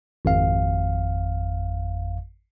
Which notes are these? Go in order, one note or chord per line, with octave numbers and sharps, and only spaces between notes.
G#1 F2 F5